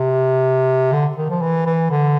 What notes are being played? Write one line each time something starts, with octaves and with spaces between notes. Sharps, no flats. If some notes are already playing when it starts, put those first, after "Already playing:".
Already playing: C3
D3
D#3
F3
E3
E3
D3